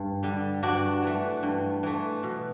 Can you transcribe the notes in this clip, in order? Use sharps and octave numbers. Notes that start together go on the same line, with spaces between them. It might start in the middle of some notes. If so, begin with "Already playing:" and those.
Already playing: G2
D3 G3
G2 D4 F#4
E3 A3
G2
E3 A3
B2